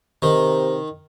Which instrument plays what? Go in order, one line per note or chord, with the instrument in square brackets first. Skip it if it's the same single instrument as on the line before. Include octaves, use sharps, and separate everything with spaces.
[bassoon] C3 [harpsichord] D#3